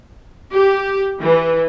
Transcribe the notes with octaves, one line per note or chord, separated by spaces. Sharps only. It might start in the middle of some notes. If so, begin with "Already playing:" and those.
G4
E3